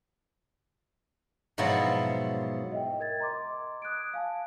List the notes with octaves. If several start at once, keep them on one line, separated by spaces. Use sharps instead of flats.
G#2 B2 F3 F#3 E4
D#5 E5 G5
A#4 G#6 A6
D#5 A#5 C6 D6
D#6 F#6 G#6 D7
F5 G#5 A5